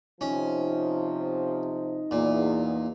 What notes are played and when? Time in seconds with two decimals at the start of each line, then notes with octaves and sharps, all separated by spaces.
0.21 C3 F3 C#4 D#4
2.11 E2 A#2